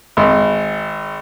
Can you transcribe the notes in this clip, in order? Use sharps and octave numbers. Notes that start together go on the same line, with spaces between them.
G#1